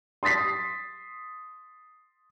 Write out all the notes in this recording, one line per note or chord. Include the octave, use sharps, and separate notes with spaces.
C6 D#6 A6 B6 C7